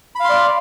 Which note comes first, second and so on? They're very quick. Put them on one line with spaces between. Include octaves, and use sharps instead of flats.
B5 F5 C6 D5